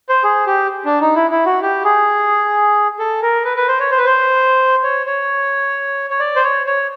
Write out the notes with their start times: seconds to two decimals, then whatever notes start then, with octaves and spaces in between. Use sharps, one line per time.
0.09 C5
0.24 G#4
0.47 G4
0.85 D4
1.01 D#4
1.15 E4
1.31 E4
1.46 F#4
1.62 G4
1.84 G#4
2.99 A4
3.22 A#4
3.45 B4
3.57 B4
3.68 C5
3.80 C#5
3.91 C5
3.98 B4
4.06 C5
4.83 C#5
5.06 C#5
6.10 C#5
6.20 D5
6.36 C5
6.44 C#5
6.67 C#5